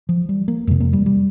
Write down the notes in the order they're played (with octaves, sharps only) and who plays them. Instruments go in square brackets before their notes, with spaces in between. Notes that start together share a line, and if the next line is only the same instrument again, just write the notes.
[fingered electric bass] F3
G3
A#3
F2 C3 G#3
A#3
G3
G3